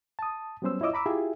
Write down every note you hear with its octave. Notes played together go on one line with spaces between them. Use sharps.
A5 D#6
F#3 G3 B3 C#4 C5 E6
E4 F4 C#5 D#5 D6 E6
A#5 B5 D6 E6
E4 F4 G4 G#4 E5